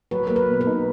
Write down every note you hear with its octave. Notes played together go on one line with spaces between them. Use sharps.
F#3 B4
A#3 A#4
B4
B2
B4
D#4